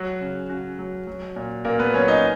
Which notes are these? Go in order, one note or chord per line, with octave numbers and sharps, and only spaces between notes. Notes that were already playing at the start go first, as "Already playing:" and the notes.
Already playing: F#3 F#4
C#3
C#3 F#4
F#3
F#3
A#2
A#2 A#3 A#4
B3 B4
F#3 C#4 C#5
D#4 D#5